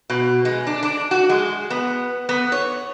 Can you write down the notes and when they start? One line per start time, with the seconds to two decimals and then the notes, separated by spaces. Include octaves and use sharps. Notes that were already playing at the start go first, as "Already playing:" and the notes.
0.10 B2
0.45 G#3
0.67 D4
0.83 D4
1.11 F#4
1.29 G#3
1.70 B3
2.29 B3
2.52 C#5